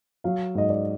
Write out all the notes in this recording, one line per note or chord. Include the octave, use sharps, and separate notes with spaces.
F#3 F5
G#2 D#5
D5